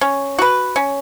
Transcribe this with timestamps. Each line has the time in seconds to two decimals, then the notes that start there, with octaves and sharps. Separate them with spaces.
0.01 C#4
0.39 F#4 B4
0.76 C#4